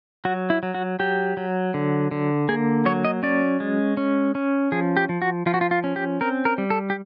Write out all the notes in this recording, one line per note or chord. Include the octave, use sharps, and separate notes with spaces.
F#3 F#4
E4
F#3
F#4
F#3 G4
F#3
D3
D3
A#3 G#4
F#3 C#5
D#5
C#4 D5
G#3
C#4
C#4
F3 G#4
G4
F3
F#4
F3 F4
F#4
F4
F4
C#4
G4
C4 A#4
A#4
G3
A4
G4